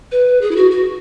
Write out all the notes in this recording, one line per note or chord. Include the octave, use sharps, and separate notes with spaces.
B4
G#4
E4
F#4
F#4